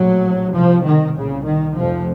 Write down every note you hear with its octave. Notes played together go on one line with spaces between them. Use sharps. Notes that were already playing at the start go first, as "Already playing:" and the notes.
Already playing: A#1 A2 F#3
C2 C3 F3
D#3
C2 A#2 C#3
D#3
F1 F2 C3 F3